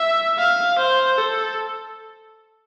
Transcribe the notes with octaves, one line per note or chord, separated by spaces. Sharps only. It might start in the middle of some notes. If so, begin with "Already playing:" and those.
Already playing: E5
F5
C5
A4